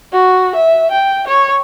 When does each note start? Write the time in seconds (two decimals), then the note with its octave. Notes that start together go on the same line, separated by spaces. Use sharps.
0.12 F#4
0.55 E5
0.91 G5
1.28 C#5